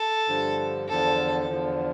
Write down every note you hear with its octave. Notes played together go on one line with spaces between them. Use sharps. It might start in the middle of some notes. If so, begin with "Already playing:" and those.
Already playing: A4
G2 D3 F3
E2 D3 F3 A4
E2 D3 F3